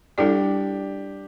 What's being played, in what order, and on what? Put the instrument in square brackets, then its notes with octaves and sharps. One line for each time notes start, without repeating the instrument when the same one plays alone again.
[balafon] G3 E4 A4 D5 [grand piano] D4 G4